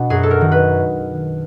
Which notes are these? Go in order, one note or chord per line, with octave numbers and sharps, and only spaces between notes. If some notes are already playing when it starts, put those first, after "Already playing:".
Already playing: B2 D4
F#2 G#4
A4
A#4
D#3
B4